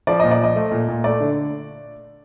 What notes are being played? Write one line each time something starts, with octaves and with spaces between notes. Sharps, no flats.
F3 D5
A#2 D#5
D5
F3 D#5
A3
A#2
A#2
A3 D5
D3